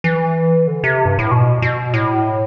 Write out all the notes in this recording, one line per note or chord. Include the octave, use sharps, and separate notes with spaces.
E3
D3
C3
G2
A2
B2
B2
A2